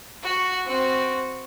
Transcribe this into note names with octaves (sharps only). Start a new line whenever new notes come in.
F#4
C4 F#4